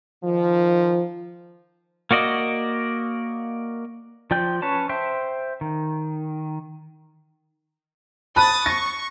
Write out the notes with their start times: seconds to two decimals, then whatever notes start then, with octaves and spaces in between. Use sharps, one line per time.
0.24 D#3 F3
2.11 A#3 F#4 D5 D#5
4.31 F3 F4 D5 G5 G6
4.62 C#4 B4 C#5 A5
4.89 C5 E5 G5
5.61 D#3
8.36 A5 B5 D#6 F#6 A6
8.66 C#6 A#6